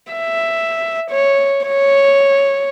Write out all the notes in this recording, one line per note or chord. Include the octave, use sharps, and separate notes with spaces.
E5
C#5
C#5